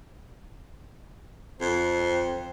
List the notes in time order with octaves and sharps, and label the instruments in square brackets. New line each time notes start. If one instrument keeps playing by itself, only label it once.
[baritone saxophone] F2 [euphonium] C4